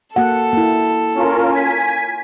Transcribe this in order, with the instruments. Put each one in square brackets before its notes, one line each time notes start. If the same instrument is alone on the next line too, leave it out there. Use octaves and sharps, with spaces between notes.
[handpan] A#3 F#4 F#5 [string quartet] A4
[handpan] A#3 E4
[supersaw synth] C#4 F4 A#4
G#5 B6